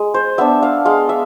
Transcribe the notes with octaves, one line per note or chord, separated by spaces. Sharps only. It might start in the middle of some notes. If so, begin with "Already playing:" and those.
Already playing: G#3
C5
B3 D4 E5
F5
G#3 F5
E5